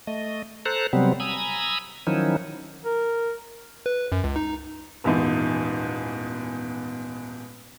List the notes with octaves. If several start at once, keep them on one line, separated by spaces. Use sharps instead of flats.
A3 D#5
A4 C5 A#5 F#6
C3 F#3 G3 B3 C4
G#5 A#5 B5 D#6 E6
D#3 F3 F#3 C#4 D#4 E4
A#4
B4
F#2
C#2
D#4
D#1 E2 G#2